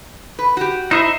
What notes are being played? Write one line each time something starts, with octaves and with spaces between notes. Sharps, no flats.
B4
F#4 G4
D#4 E4 C5 D#5 E5